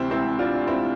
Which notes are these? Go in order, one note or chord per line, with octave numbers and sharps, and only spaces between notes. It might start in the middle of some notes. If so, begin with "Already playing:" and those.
Already playing: D2 C3 E3 C4 E4
C4 E4
D4 F4
C4 E4